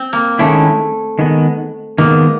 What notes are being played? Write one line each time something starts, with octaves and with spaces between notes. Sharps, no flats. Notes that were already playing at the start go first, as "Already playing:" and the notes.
Already playing: C4
A#3
D#3 G#3 A3 C#4 E4
D#3 G#3 B3
D#3 G#3 A#3 B3